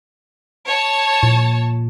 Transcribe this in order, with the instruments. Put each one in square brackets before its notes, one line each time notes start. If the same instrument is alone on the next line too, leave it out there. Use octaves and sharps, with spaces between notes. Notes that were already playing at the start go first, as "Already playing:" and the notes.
[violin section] C#5 A5
[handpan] A#2